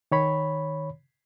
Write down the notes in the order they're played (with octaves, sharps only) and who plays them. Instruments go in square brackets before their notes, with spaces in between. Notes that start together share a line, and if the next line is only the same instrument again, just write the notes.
[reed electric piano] D#3 C#5 B5